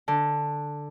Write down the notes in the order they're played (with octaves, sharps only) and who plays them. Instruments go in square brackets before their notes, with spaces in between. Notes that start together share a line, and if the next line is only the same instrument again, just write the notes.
[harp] D3